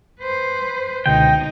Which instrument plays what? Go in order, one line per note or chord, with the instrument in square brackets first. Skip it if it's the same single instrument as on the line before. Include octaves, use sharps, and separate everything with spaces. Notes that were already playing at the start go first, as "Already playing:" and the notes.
[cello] B4 C5
[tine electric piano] C#2 B2 D3 [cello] D#4 [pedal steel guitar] G5